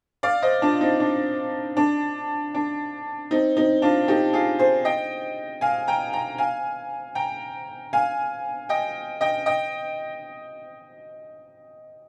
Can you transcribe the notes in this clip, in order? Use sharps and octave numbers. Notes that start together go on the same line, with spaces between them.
D5 F5
C5 D#5
D4 F4
C4 D#4
D4
D4
D4
C4 D#4
C4 D#4
D4 F4
D#4 G4
F4 G#4
G#4 C5
D#5 G5
F5 G#5
G5 A#5
G5 A#5
F5 G#5
G5 A#5
F5 G#5
D#5 G5
D#5 G5
D#5 G5